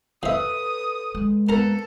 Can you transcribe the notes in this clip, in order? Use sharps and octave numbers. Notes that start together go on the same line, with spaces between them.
F3 A4 B4 C#5 E5 D#6
G#3
A#3 B3 C#4 A4 A#4 A#5